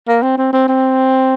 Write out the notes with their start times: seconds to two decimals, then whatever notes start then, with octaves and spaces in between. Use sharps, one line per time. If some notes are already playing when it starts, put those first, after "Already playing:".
0.08 A#3
0.22 C4
0.38 C4
0.53 C4
0.68 C4